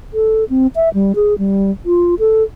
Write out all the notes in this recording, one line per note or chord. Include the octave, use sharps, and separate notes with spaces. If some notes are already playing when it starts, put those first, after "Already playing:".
A4
C4
E5
G3
G#4
G3
F4
A4